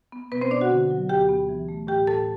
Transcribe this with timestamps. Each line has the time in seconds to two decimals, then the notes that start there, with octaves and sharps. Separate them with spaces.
0.12 B3
0.32 B2 B3 B4
0.41 C4 C5
0.51 B2 D4 D5
0.61 F#4 F#5
0.71 D3
0.91 F#3
1.09 D2 G4 G5
1.29 B3
1.49 E3
1.69 A3
1.87 A2 G4 G5
2.07 A2 A4 A5